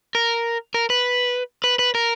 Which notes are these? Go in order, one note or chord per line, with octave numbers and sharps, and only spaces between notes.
A#4
A#4
B4
B4
B4
A#4